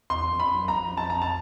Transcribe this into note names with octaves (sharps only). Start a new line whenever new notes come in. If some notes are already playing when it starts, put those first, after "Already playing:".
E2 C6
F2
B5
F#2
A#5
F2
A5
A#5
A5